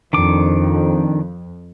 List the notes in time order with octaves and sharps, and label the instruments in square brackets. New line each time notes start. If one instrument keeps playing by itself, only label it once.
[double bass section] F2 [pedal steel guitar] D#3 D4 D6